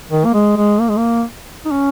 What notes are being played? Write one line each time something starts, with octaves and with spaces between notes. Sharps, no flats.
D#3
A#3
G#3
G#3
A#3
G#3
A#3
D#4
C#4